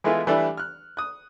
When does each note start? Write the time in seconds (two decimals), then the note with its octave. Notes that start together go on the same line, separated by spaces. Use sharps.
0.04 E3 G#3 A3 B3 E4 F4
0.27 E3 G3 A3 D4 E4 D5
0.57 F6 F#6
0.97 D#6 F#6